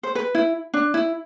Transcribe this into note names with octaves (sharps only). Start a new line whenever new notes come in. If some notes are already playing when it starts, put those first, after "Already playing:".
C5
B4
E4
D4
E4